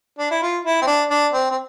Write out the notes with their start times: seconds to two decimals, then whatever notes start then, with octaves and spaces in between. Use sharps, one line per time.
0.19 D4
0.31 E4
0.42 F4
0.65 E4
0.82 C4
0.87 D4
1.10 D4
1.33 C4
1.51 C4